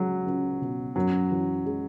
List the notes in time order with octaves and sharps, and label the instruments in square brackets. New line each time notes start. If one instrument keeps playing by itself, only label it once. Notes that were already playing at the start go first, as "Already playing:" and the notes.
Already playing: [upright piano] C#2 G#3 [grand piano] F#3
[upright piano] C#2
B2
[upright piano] F#2 [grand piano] F#3
[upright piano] E3
G#3